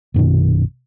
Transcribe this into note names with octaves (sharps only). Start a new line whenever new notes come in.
A#1 F#2 B2 D#3